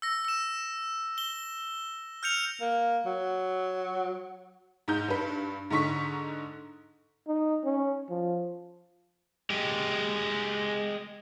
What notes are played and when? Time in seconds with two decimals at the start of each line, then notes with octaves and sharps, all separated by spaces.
0.02 E6 A#6
0.25 E6 E7
1.18 G7
2.23 F6 G6 C#7 F7
2.61 A#3
3.06 F#3
4.88 G#2 D#4 G6
5.08 G2 B4
5.70 G#2 D3 D#4 C#6 B6
7.28 D#4
7.64 C#4
8.10 F3
9.50 G#3 G4